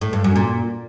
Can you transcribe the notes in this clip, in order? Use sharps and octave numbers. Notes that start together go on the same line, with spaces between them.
A2
G2
F#2
A#2